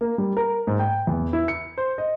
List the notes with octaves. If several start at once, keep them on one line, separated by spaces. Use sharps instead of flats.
A#3
G3
A#4
G#2
G5
E2
E4
C#7
C5
D#5